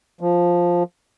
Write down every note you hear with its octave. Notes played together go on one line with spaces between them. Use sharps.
F3